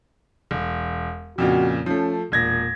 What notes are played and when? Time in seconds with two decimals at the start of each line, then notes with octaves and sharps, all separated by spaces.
0.51 E1
1.38 F2 A#2 C#3 F#4
1.86 F3 A3 C#4
2.32 E1 A#2 G#6 A#6